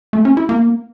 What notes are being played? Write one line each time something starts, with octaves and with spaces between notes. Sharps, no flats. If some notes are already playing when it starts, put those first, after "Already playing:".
A3
C#4
E4
A#3